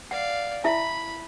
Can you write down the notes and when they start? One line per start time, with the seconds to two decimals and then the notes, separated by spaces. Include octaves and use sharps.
0.11 D5 F5 F#5
0.64 E4 E5 A5 B5